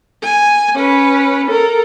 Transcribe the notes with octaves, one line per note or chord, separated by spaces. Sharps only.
G#5
C#4 B4
A4 A#4